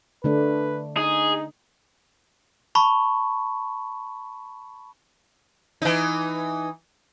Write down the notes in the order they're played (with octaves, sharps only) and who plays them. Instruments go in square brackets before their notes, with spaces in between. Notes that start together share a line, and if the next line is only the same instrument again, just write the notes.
[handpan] D3 A3 D4 [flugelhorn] B4
[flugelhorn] D#4 [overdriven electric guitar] G#4
[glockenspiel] A5 B5 C#6
[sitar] E3 D#4